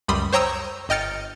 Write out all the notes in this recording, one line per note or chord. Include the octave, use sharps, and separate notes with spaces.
C#2 F#2 G3 B5 C6 D#6
C5 C#5 G5 A#5 D#6 E6
G1 D#5 G5 F6 A6 C#7